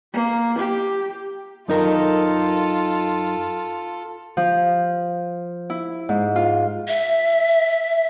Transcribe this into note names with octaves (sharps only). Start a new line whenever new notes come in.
A#3
G4
F#2 D#4 F4 A4 A#4
F3
E4
G#2
F4
E5